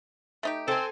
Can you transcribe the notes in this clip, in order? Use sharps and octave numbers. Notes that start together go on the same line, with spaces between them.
A3 D#4 G4
C4 A4 G#5